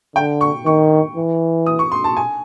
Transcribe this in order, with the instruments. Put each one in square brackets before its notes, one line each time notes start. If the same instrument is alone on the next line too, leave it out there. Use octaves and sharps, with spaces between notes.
[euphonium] D3 [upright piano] G5
[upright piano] C#6
[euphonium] D#3 [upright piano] C#6
[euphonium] E3
[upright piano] D#6
C#6
C6
A5
G#5